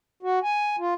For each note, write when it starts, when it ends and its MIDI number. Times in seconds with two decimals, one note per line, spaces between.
0.23 0.39 66
0.43 0.76 80
0.79 0.94 65